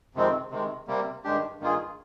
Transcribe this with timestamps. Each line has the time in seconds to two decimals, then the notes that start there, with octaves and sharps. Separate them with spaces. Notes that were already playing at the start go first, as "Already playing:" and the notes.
0.15 F2 C3 D#3 G#3 C4
0.51 C3 D#3 G#3
0.88 C3 G3 A#3
1.24 G2 D#3 G#3 D4 G4
1.60 G2 D#3 A#3 F4 G#4